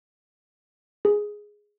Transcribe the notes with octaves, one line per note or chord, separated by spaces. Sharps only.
G#4